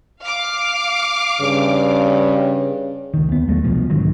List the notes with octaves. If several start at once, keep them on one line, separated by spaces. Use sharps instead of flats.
F5 D6
G2 C#3
C#2 D#3
D#2 B3
D#2 F#3 G#3 A3
C2 B2 F3
G#2 D3 D#3 F#3